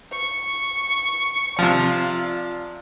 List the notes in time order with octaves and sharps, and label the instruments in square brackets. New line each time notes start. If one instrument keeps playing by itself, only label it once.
[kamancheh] C#6
[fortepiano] C3 F3 [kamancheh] F4 D5